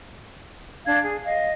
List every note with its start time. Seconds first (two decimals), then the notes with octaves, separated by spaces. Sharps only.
0.85 D4 F5 G#6
1.03 G#4
1.24 D#5 F5